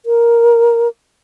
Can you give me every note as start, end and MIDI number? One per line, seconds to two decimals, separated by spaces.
0.06 0.88 70